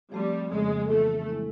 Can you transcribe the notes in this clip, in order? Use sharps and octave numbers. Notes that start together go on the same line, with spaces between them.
F3 G3 A3 C4
F2 C#3 F3 G#3 A#3 C#4
E3 G3 A3 B3 D4 F4
A2 F3 G#3 C4 E4